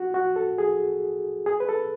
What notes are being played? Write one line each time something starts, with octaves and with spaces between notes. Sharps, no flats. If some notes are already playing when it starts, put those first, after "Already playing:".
Already playing: F#4
F#4
A4
G#4
G#4
B4
A4